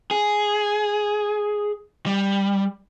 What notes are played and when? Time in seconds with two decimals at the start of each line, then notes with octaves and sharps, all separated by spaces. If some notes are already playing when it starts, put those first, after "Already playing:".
0.11 G#4
2.06 G3